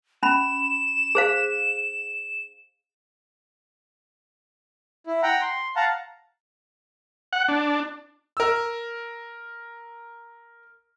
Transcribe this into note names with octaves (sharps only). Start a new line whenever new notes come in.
C#4 B5 E7
G#4 C5 F5
E4
F#5 G5 A#5
C6
F5 F#5 A5 A#5
F#5
D4
A#4 E6